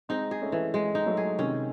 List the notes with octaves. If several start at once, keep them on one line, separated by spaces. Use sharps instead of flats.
G#3 C4 D#4
G#4
A3 C#4
E3
G#3
D#4
F#3 A3
G#4
C3 D#3 C#4